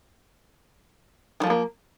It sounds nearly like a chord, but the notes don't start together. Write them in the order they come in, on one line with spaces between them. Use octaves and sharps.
D#3 F3 G#3 A#3